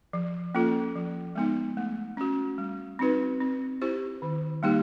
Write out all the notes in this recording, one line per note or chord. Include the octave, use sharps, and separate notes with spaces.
F3
A#3 C#4 F4 A4
F3
G#3 B3 D#4
A3
C#4 F#4
G3
C4 D#4 F#4 B4
C4
E4 G4 C5
D#3
G3 A#3 D#4 G4